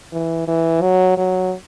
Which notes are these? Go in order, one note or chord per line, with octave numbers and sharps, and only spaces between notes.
E3
E3
F#3
F#3